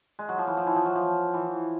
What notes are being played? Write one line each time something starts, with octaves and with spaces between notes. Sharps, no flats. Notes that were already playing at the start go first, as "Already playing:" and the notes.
G#3
F#3
F3
E3
F3
E3
F3
F#3
F3
E3